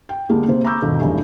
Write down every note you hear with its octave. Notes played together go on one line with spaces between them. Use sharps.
G5
D2 G3 G#3 A#3 D4
C3 A#3 C5
A#5 B5 C#6 D6 E6 G6
G1 D#2 B2 A4
F1 A#1 G#2 E3 G3 G#5